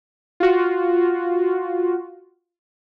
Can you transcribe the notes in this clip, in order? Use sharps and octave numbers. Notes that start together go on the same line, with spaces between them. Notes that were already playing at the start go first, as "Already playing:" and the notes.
F4 F#4